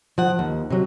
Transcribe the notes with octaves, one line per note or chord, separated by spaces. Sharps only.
F3 F#5
D#2
C3 F#3